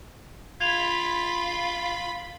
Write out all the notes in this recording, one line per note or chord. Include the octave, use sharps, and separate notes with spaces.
F4 B5 G#6 F7